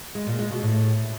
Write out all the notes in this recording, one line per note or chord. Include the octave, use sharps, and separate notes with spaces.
G#3
A#2
G#3
B2
A2